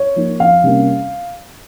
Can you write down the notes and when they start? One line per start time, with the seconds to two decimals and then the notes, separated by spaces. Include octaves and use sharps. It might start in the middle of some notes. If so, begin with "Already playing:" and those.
Already playing: C#5
0.16 F3 A#3 D#4
0.40 F2 F5
0.63 C3 G3 A#3 C#4